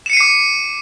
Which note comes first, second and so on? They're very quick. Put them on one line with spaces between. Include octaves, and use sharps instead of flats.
E7 C#7 D#7 C7 D6